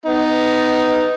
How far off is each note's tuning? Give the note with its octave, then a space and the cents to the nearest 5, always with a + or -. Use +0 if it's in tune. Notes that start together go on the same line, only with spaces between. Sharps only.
B3 +25 D#4 +0